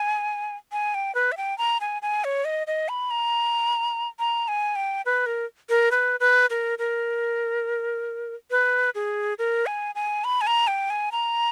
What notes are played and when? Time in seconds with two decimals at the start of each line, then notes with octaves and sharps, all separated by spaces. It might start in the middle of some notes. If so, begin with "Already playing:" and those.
Already playing: G#5
0.72 G#5
0.94 G5
1.15 B4
1.32 E5
1.37 G5
1.58 A#5
1.81 G#5
2.02 G#5
2.24 C#5
2.45 D#5
2.67 D#5
2.89 B5
3.11 A#5
4.19 A#5
4.48 G#5
4.76 G5
5.06 B4
5.26 A#4
5.69 A#4
5.91 B4
6.20 B4
6.50 A#4
6.79 A#4
8.51 B4
8.95 G#4
9.39 A#4
9.66 G#5
9.95 G#5
10.24 B5
10.41 G#5
10.47 A#5
10.67 G5
10.90 G#5
11.12 A#5